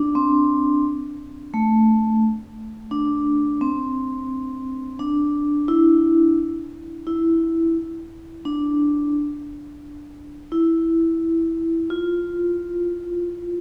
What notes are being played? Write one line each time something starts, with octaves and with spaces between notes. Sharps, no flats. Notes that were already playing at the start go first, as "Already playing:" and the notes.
Already playing: D4
C4
A3
D4
C4
D4
E4
E4
D4
E4
F4